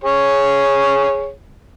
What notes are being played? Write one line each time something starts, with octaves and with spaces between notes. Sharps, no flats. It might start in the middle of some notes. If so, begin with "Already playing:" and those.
G#4 C#5